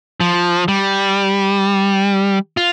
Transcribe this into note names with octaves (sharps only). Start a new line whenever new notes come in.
F3
G3
F4